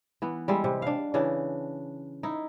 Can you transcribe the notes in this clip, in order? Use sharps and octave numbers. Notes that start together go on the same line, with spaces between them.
E3 B3
G3 G#3 E4
C3
D4 F5
C#3 E3 D4
D#4 E4